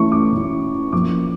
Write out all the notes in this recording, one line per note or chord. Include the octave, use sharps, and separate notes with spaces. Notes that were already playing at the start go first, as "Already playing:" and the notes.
Already playing: E3 A3 C#4 E4 C#6
D6
E3 A3 C#4 E4
F3 A#3 C#4 E4 D6